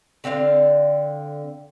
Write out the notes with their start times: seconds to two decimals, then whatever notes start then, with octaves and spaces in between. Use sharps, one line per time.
0.24 D3 C4 D5 F5